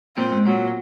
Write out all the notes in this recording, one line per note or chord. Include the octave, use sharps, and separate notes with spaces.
A#2 C4
G#2
A#2 F#3